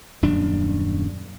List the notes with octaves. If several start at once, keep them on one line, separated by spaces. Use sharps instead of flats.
D#1 F#2 D4